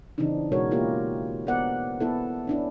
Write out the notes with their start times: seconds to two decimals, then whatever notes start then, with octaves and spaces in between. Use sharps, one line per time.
0.18 C#3 E3 C4 D4 D#4
0.52 B2 G#3 F#4 A#4 C#5
0.71 A#3 E4 F4 G4 A#4
1.47 B3 A#4 C5 D5 F#5
2.00 B3 E4 A4
2.47 C#4 D4 E4